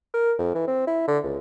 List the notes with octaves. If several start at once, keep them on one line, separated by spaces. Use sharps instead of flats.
A#4
F2
E3
C4
E4
D3
C#2